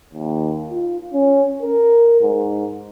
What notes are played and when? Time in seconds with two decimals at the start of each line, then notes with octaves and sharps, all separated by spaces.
0.14 D#2
0.70 F4
1.14 C#4
1.62 A#4
2.21 G#2